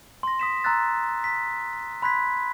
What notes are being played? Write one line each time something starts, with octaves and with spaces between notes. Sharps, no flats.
C6 A#6
D#6 B6 E7
A#5 C6 E6 F#6 A6
B6
B5 C6 F#6 G#6 B6